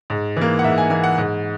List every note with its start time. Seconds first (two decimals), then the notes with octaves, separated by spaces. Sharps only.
0.10 G#2
0.37 E3 A#3
0.59 F#5
0.64 G#2 E5
0.78 G#5
0.90 E3 A#3 G#5
1.04 F#5
1.18 G#2